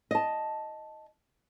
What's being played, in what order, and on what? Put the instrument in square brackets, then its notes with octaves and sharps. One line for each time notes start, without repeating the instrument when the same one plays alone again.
[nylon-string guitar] D#5 A5